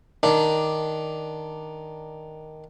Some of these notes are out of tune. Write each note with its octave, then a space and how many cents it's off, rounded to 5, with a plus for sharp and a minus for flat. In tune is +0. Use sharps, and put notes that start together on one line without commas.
D#3 +0 D4 +0